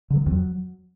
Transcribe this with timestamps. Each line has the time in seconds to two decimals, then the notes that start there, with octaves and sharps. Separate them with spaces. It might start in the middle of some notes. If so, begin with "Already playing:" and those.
0.10 D3
0.16 F#3
0.21 D#3
0.26 F2
0.32 F#3